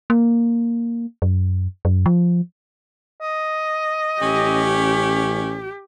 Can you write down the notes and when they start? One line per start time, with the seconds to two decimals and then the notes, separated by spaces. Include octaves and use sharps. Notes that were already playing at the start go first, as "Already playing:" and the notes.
0.10 A#3
1.22 F#2
1.85 F#2
2.06 F3
3.21 D#5
4.22 A1 C#4 G4